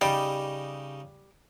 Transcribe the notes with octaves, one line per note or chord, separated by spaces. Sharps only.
C#3 G3 D#4 G4